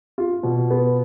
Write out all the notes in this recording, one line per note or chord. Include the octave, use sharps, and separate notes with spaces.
F4
B2
B3